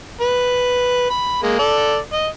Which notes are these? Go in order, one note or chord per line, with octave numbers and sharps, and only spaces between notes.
B4
B5
G#3 A#3
A4 D5
D#5